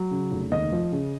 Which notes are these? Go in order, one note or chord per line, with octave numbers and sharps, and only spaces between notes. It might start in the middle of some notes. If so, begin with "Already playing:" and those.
Already playing: F#3
C#3
F1
D#2 D#5
F3
C#3